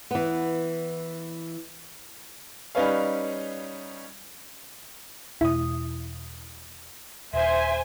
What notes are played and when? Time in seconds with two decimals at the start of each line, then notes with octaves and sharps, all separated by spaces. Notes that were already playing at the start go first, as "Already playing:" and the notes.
0.11 E3 B3
2.75 G3 C#4 D#4 B4 C#5 F5
5.41 E2 B2 G#3 E4 D#6
7.34 D#1 C5 E5 G#5